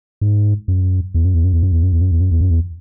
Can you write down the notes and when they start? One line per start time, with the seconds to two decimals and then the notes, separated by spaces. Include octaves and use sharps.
0.21 G#2
0.68 F#2
1.14 E2
1.25 F#2
1.34 E2
1.44 F#2
1.53 E2
1.63 F#2
1.72 E2
1.83 F#2
1.93 E2
2.01 F#2
2.11 E2
2.21 F#2
2.31 E2
2.41 F#2
2.50 E2